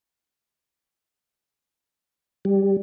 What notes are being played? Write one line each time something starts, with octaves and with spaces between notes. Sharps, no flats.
G3